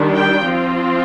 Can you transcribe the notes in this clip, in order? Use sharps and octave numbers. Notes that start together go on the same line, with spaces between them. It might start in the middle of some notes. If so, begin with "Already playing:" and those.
Already playing: D#3 G3 D4
G5
F3 C4 F4